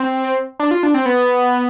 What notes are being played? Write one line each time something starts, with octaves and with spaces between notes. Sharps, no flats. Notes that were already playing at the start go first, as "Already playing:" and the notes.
Already playing: C4
D4
F4
D4
C4
B3